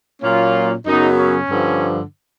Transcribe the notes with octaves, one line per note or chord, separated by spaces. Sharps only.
A#2 F#3 A#3 C#4 F4
F#2 C#3 F#3 B3 D#4
C#4
G2 D3 F3